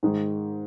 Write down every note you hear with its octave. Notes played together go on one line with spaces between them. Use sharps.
G#2 D#3 G#3